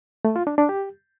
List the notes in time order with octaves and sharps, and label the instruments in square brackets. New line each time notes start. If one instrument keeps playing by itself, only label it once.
[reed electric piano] A3
F4
D4
D4
G4